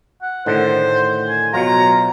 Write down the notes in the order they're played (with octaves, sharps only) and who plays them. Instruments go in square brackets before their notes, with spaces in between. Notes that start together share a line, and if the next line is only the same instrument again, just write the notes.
[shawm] F#5
[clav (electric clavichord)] A2 D3 D#3 [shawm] C5
[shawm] G#5
[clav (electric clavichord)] B2 F#3 F4 [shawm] A#5